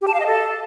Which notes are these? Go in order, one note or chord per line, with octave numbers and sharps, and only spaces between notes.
G4
A5
F5
D#5
A4